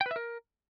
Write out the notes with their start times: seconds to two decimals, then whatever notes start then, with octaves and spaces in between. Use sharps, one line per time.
0.01 G5
0.06 B4
0.11 E5
0.16 A#4